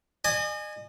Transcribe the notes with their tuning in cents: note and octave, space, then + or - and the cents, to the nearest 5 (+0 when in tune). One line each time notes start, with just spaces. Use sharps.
D#5 -40 G#5 +0